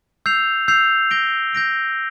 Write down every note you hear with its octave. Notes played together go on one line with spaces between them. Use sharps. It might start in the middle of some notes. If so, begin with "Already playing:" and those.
E6 G6 C7 F7
E6 G6 C7 F7
G6 A#6 D7 G7
G6 A#6 D7 G7